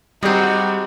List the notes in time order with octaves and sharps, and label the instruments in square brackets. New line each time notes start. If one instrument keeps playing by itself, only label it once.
[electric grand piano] G3 G4 [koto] G#3 C4 [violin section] D#4 F#4